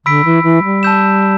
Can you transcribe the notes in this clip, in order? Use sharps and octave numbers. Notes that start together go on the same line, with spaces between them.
D3 B5 E6 B6 D7
E3
E3
G3
A5 E6 G6 E7